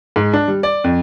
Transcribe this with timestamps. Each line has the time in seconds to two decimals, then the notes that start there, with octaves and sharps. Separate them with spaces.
0.16 G#2
0.33 D4
0.48 G3
0.63 D5
0.84 F2